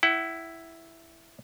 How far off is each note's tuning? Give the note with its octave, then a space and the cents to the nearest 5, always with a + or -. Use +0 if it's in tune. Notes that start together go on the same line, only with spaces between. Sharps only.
E4 +0 F#5 +35